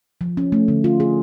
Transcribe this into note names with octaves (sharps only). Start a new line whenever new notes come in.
F3
C#4
A3
D3
F4
G#4